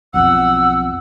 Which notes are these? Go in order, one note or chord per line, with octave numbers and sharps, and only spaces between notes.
B1 F2 F#5 E6